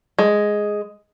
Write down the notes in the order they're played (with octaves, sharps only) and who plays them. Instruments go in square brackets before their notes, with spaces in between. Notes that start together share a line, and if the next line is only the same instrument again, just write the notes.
[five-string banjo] G#3